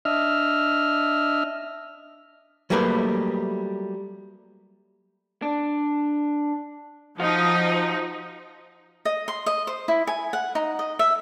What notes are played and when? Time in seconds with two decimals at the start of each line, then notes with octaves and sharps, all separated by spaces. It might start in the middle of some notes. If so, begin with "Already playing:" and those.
0.05 D4 D#5 E5 F6
2.70 F#3 G3 A3 A#3 A#4 B4
5.42 D4
7.20 F3 D#4 F#4 F5
9.05 D#5
9.28 C6
9.46 D#5
9.67 C5
9.88 E4
10.07 G#5
10.33 F#5
10.55 D#4
10.79 D#5
10.99 E5